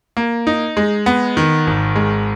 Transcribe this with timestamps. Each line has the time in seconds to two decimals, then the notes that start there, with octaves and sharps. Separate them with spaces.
0.17 A#3
0.47 D#4
0.77 G#3
1.06 B3
1.37 D#3
1.67 G#1
1.96 G#3